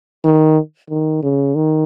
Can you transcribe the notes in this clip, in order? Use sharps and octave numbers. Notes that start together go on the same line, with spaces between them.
D#3
D#3
C#3
D#3